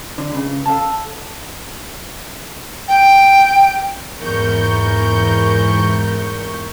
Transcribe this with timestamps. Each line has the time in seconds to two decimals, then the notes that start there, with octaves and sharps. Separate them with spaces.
0.18 D3
0.32 C#2 C#3
0.66 A4 F5 A5
2.88 G5
4.21 E2 G#2 E3 A#4 C#6 G6